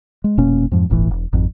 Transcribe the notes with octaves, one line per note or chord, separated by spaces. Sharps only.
G#3
F1 B2 A#3 C#4
F2 G#2 F3
D1 G1 A2 E3
E1
G#1 F2